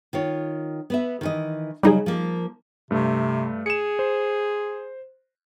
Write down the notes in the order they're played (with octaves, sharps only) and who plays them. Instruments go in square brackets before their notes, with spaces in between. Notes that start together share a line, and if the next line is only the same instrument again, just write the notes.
[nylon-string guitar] D#3 F4 C#5
B3 B4 E5
D#3 E3 D#5
[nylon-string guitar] C#3 F#3 [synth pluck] G3 D#4 G#4
[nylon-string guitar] F3 A#3
[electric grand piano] G2 A3 [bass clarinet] C3
[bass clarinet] G#4 [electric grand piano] C#7 E7
[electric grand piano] C5